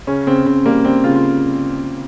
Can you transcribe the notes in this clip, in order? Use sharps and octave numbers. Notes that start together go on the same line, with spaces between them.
C#3 C#4
C#3 C4
C#3 C4
G3 A#3
G3 C4
C#3 F4
F4